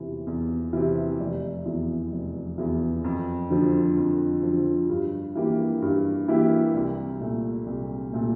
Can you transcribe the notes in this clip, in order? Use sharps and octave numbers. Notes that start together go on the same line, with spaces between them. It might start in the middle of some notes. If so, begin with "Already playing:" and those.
Already playing: E2 C3 E3
E2
C3 E3
F1
E2 E3
F1
E2 E3
F2
D3 F3
F2
D3 F3
G2
E3 A#3 E4 G4
G2
E3 A#3 E4 G4
C2
A#2 A3
C2
A#2 A3